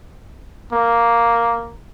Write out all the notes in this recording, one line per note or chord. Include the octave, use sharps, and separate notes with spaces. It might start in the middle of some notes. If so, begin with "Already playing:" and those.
A#3